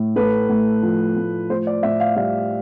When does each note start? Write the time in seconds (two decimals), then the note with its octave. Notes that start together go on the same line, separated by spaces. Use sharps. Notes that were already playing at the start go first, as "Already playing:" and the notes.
Already playing: A2
0.16 A3 B4
0.49 A2
0.83 F3
1.16 A2
1.50 A2 C5
1.67 D5
1.83 A2 E5
2.00 F5
2.16 G3 F5